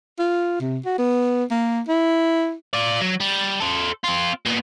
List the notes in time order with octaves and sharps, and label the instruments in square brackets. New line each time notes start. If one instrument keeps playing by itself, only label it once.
[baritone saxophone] F4
C3
F#4
B3
A#3
E4
[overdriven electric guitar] F4 D5
F#3
G3
A4 C5
C4 F4
A#2 B3